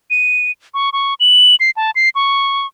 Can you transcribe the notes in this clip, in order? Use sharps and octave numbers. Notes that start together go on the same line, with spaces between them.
D#7
C#6
C#6
F#7
C7
A5
C7
C#6